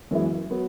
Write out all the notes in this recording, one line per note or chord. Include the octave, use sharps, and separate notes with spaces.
F#2 E3 G#3 B3 E4
F#3 B3